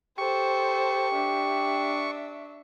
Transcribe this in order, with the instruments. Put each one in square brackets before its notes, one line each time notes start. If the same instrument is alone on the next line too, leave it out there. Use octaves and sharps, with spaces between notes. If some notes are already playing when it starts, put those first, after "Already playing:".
[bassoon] G4 [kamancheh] A4 C5 [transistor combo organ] C#6
[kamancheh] D4 E5